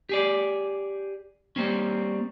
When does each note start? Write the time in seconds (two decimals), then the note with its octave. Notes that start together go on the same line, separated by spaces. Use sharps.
0.09 G4 G#4 D5
1.56 G3 A#3 C4 C#4